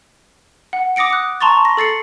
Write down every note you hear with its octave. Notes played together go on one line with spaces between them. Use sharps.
F#5
D6 D#6 A#6 C#7 D7
D#6 F#6
A5 A#5 C6 C#6 A6
A#6
A4 A6 C7 C#7